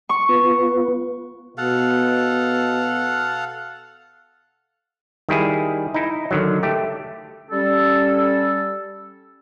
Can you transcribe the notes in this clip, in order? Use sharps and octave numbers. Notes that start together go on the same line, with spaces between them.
C#6
B3 F4 B4
B2 A4 F5 F#5
D#3 G3 E4 G#4
D#4 E4
D3 D#3 F#3
A3 G4
G3 C#4 A4